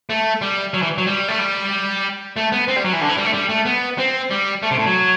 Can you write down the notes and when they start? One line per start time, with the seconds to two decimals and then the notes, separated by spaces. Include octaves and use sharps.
0.10 A3
0.42 G3
0.74 F#3
0.82 E3
0.98 F#3
1.07 G3
1.28 A3
1.39 G3
2.36 A3
2.52 B3
2.68 C4
2.76 G3
2.84 F#3
2.93 E3
3.01 D3
3.09 E3
3.17 G3
3.25 A3
3.33 G3
3.49 A3
3.66 B3
3.98 C4
4.30 G3
4.63 A3
4.71 C3
4.79 A2
4.87 F#3